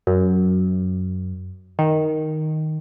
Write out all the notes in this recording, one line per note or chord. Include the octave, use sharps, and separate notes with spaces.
F#2
D#3